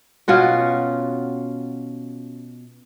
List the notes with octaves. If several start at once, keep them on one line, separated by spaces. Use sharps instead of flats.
B2 C#4 F4 F#4